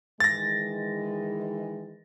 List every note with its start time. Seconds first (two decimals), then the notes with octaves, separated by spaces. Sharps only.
0.20 D#3 E3 G#3 A6 A#6